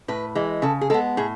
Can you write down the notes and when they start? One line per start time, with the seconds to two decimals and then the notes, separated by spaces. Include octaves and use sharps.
0.08 A2 B4
0.35 E3 G#3
0.62 C#3 A4
0.81 G#4
0.90 G#3 B3 A4
1.17 A2 G#4